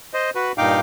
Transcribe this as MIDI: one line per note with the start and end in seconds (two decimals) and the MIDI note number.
0.14 0.30 72
0.14 0.30 75
0.35 0.52 66
0.35 0.52 71
0.58 0.80 43
0.58 0.80 46
0.58 0.80 63
0.58 0.80 77
0.58 0.80 79
0.58 0.80 86